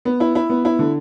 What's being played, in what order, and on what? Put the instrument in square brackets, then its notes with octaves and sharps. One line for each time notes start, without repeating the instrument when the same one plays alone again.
[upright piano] B3
E4
E4
B3
E4
D3